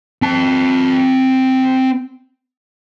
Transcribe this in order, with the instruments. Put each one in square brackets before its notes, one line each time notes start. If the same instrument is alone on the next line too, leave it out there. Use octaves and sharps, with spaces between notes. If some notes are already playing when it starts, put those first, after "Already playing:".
[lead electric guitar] C4 A5